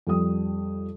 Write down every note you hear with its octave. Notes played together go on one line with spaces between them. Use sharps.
F2 G3 D#6